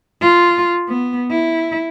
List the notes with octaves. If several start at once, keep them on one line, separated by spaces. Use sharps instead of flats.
F4
B3
E4